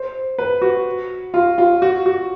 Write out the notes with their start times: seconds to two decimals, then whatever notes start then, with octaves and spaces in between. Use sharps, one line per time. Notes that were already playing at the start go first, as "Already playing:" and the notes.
Already playing: C5
0.38 B4
0.62 F#4
1.34 F4
1.58 F4
1.82 F#4
2.06 F#4